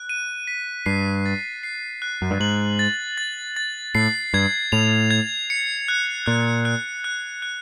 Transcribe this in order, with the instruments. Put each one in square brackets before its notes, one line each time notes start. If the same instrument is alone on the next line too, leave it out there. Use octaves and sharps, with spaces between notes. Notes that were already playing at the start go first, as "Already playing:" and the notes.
Already playing: [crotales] F#6
D#7
B6
[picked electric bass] G2 [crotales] C7
[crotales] A6
C7
F#6
[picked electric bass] F#2
G2
[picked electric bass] G#2 [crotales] F#7
[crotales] A6
A6
A6
[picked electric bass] A2 [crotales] C7
[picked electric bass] G2 [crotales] G#6
[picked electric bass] A2 [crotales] F7
[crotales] G#6
C#7
F#6
[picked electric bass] A#2 [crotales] F#6
[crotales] F#6
F#6
F#6